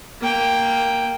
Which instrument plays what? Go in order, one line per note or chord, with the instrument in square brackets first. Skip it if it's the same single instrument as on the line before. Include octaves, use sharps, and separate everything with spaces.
[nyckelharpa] A#3 G5